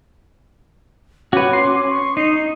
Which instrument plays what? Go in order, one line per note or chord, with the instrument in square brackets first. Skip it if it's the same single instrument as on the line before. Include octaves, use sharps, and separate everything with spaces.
[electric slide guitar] C#4 [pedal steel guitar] F#4 B4 [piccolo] D6
[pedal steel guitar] C6
[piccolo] C#6
[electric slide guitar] D#4 [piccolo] C7